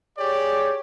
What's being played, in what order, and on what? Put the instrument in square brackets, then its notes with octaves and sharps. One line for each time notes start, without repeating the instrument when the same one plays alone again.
[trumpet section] G4 D5 [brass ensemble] G#4 C#5